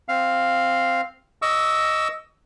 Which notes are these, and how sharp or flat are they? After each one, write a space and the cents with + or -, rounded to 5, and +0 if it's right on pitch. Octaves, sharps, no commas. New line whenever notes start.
C4 +0 F5 +0
D#5 +5 C#6 +35 E6 +0